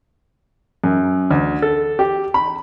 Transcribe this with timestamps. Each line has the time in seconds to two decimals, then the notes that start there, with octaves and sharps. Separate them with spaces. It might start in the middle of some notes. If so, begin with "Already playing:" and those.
0.84 F#2
1.31 D2
1.62 A4
1.99 G4
2.34 B5